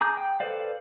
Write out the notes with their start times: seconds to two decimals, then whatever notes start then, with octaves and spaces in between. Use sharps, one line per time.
0.01 G#4 A#5 D6 G6
0.17 G5
0.40 A4 B4 C5 D5 F5